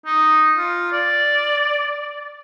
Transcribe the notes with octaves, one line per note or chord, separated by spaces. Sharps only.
D#4
F4
D5